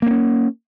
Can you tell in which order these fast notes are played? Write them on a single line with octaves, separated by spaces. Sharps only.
A#3 C4 C#4